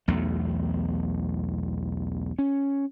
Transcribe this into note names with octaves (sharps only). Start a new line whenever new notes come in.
B1 E2 A3
C#4